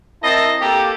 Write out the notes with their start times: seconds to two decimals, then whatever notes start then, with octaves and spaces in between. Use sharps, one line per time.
0.23 C4 E4 A#4 D#5 A5
0.61 A#3 G4 A4